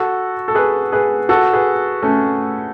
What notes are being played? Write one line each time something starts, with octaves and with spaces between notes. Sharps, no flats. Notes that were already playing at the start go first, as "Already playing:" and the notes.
Already playing: F#4 A4
A4
G#4 B4
G#4 B4
F#4 A4
G#4 B4
A3 C#4